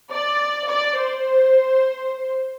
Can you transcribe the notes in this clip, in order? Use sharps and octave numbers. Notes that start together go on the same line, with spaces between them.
D5
D5
C5